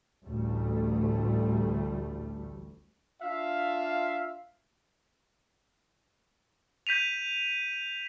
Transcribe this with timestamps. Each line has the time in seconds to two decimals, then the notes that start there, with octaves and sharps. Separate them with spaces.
0.24 A1 D2 G3 A3
3.21 D4 F4 E5 F5
6.87 G6 B6 D#7 F7